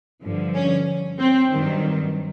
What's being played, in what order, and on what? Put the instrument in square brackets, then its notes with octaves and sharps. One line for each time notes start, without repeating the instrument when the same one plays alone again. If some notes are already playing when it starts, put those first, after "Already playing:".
[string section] G2 D3 F3
C#4
C4
G2 D#3 F#3